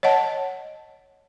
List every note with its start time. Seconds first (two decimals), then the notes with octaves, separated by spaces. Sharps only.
0.03 C#5 D#5 F#5 A5